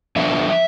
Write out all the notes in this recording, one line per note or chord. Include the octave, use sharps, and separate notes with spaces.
D3 F3 B3 D4 E5